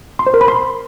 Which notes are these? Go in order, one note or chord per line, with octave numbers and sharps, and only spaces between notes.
C6
C5
A#4
B5
C6